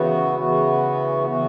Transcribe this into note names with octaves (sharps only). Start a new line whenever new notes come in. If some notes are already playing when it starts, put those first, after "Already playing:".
Already playing: C#3 E3 B3 F#4
C#3 E3 B3 F#4
C#3 E3 B3 F#4